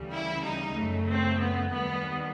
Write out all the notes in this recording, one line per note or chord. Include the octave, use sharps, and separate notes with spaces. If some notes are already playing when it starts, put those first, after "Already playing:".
Already playing: D2 C#3 E3 G3
E4
D#4
F#2 C#3 F#3 A3
C4
B3
D#2 D#3 G3 B3